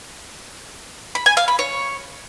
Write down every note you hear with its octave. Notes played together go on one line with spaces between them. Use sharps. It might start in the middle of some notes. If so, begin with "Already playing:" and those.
B5
G#5
F5
B5
C#5